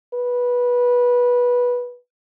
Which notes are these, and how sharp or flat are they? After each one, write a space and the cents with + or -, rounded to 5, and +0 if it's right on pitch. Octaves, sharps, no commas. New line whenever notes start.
B4 -15